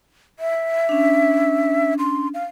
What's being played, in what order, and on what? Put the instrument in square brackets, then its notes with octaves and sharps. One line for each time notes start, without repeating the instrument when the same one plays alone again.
[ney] E5
[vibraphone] C#4 D4
[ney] C6
F5